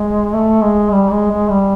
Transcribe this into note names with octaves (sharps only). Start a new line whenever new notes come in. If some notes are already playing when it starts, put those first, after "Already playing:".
Already playing: G#3
A3
G#3
G3
G#3
G#3
G3